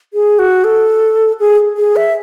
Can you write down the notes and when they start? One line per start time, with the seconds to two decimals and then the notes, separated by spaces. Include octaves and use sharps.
0.14 G#4
0.39 F#4
0.64 A4
1.40 G#4
1.77 G#4
1.96 E5